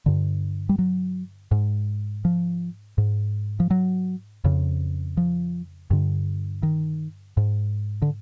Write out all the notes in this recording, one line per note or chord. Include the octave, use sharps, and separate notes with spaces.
G2 D3
G3
F#3
G#2
F3
G#2
F3
F#3
F2 C#3
F3
G2 D3
D#3
G#2
D3